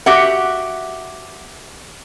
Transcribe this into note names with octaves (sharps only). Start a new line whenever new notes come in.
F#4 G4 E5 F#5